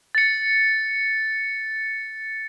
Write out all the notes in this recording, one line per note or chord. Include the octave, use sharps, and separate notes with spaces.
A6 C#7